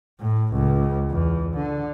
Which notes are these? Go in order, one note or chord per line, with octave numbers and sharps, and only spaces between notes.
A2
C#2
E2
D3